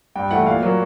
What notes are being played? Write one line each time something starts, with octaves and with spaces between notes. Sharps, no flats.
G2 G5
E3 A3 F#5
A#2 F5
F#3 A#3